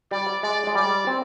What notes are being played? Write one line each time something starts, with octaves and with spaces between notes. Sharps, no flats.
G3 D5
G#3 D5
G#3
G3 D5
C4